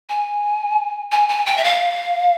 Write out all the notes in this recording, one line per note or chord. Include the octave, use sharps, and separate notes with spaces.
G#5
G#5
G#5
G5
E5
F5